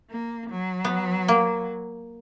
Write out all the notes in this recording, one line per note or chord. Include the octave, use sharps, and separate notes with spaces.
A#3
F#3
B3
A#3